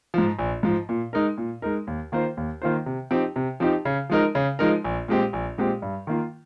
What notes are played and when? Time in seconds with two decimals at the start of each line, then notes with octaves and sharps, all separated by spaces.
0.14 G#2 F3
0.38 A#1
0.63 G#2 F3
0.89 A#2
1.13 G#3 D#4 A#4
1.38 A#2
1.62 G#3 D#4 A#4
1.87 D#2
2.12 D#3 A#3 F4 C5
2.37 D#2
2.62 D#3 A#3 F4 C5
2.86 C3
3.11 F3 C4 D#4 G4
3.36 C3
3.60 F3 C4 D#4 G4
3.85 C#3
4.10 F3 G#3 D#4 A#4
4.35 C#3
4.59 F3 G#3 D#4 A#4
4.84 A#1
5.08 A#2 G#3 C4 G4
5.33 A#1
5.58 A#2 G#3 C4 G4
5.82 G2
6.07 D#3 A#3 F4